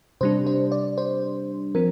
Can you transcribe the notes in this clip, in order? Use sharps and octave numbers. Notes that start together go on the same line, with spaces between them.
C3 G3 D4 C5
C5
D5
C5
F3 C4 A#4